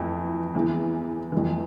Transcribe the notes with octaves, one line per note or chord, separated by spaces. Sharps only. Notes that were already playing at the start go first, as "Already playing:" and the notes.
Already playing: F2 E3
E2 E3
F2 E3